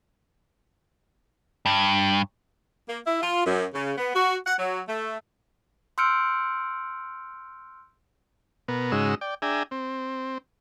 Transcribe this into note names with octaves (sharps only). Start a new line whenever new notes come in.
G2
A#3
E4
F4
F#2
C#3
B3
F#4
F#5
F#3
A3
C6 E6 F6 G6 C#7 D7
B2 B3 A#4
G#2 C#3 G#3 D#4 F#4 E6
D5 G5
D4 G#4 E5 G5 G#5 A#5
C4